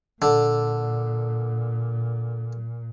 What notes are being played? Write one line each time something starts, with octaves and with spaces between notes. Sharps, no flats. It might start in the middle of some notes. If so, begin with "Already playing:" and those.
A#2 D3